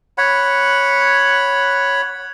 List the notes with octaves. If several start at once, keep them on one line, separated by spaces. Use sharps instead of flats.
C#5 F#5 B5